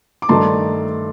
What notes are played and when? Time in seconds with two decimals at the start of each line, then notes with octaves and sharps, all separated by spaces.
0.22 D6
0.29 G2 D#3 A3 D#4 A5 C6